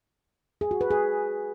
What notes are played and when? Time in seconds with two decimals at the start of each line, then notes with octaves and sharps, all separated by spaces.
0.61 G#4
0.71 F#4
0.81 B4
0.91 G#4